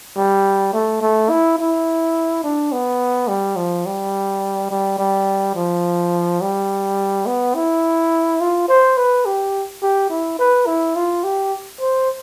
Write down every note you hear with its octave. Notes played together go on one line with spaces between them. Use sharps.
G3
A3
A3
E4
E4
D4
B3
G3
F3
G3
G3
G3
F3
G3
B3
E4
F4
C5
B4
G4
G4
E4
B4
E4
F4
G4
C5